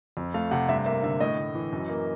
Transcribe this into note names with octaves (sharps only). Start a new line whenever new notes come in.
F2
A3 F5
C3 F#5
G2 E5
A#3 E5
D3 E5
A2 D#5
A2
E3
F#2
A#3